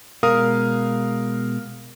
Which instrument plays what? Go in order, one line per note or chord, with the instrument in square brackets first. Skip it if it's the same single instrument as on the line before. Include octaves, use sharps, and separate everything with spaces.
[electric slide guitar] B2 G#3 [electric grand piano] A#4 F5 D#6